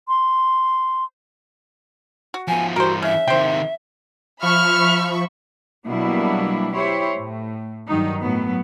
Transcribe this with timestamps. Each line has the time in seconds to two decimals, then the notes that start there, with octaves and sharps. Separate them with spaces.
0.08 C6
2.34 F#4
2.48 F3 B3 G#5
2.76 G2 E3 F#4 A#4 C5
3.02 C#3 E5
3.28 C3 D#3 C5 G5
4.43 F3 E5 B5 C#6 F6
5.86 B2 F#3 G3 A#3 D4 E4
6.73 E4 G4 C5 C#5
7.16 A2
7.88 G2 D#3 F#3 D#4
8.20 A2 F#3 B3